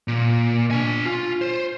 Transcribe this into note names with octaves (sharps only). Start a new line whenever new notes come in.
A#2
D4 G#5
F4
C5